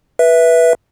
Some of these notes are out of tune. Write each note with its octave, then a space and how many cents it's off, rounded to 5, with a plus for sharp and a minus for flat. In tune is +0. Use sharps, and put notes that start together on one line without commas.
B4 -15 E5 +0